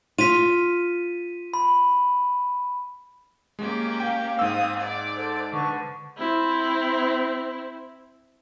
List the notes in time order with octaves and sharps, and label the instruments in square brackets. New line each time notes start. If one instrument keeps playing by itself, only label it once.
[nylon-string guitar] F4 [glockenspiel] B6 D#7
[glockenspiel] B5
[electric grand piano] G#3 [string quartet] A#3 C#4 G4
[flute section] F5 [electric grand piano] G5
[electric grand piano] G#2 E6 [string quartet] C4 D#6
[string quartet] D5
[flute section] A4 C5
[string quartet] D3 [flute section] B4 A5 C#6
[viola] C4 E4